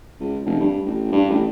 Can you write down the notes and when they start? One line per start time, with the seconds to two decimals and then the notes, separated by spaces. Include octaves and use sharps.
0.20 C#2
0.46 F1
0.60 G2
0.86 A1
1.12 G2
1.30 A1